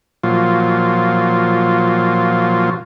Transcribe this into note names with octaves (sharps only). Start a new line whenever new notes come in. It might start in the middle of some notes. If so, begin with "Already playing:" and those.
A#2 F3 F#3 F4